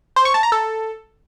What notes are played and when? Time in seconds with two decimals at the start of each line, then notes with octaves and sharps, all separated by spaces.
0.16 C5
0.25 C#6
0.34 A5
0.43 A#5
0.52 A4